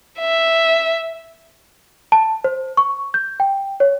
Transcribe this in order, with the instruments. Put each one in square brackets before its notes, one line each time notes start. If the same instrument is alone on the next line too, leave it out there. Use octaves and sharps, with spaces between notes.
[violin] E5
[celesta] A5
C5
C#6
G6
G5
C#5